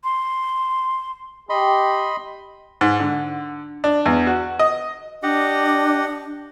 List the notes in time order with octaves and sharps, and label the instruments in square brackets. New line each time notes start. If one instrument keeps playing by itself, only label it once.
[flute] C6
[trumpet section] G4 [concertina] D#5 B5 C6
[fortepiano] G#2
D3
D4
E2
F#4
D#5
[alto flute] D4 [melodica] G4 D#5 F#5